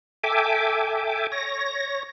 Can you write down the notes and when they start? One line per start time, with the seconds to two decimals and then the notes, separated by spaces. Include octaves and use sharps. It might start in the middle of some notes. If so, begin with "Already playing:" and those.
0.24 A4 E5 G5 G#5 D6
1.32 C#5 A#6